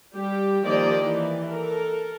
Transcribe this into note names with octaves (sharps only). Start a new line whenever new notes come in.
G3 G4
D#3 F3 A#3 G4 D5 D#5
E3
A4 A#4